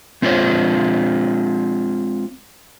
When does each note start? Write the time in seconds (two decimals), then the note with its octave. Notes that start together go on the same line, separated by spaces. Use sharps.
0.22 G#3 C4 F4 C5 C#5